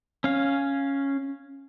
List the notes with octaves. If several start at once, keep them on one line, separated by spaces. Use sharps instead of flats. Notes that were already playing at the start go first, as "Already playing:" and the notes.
C#4 F5